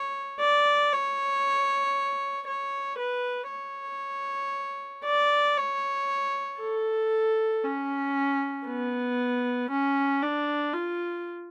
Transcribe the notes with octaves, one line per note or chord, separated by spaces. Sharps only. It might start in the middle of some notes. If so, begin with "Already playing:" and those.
Already playing: C#5
D5
C#5
C#5
B4
C#5
D5
C#5
A4
C#4
B3
C#4
D4
F4